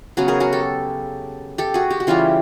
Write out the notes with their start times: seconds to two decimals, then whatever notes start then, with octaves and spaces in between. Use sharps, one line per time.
0.17 C#3 F#3 B3 F#4 G#4
0.28 G#4 A#4
0.40 F#4 G#4
0.53 G4 A4
1.58 G4 A4
1.74 F#4 G#4
1.91 G4
2.00 F#4
2.07 C#3 E3 G3 F4 G4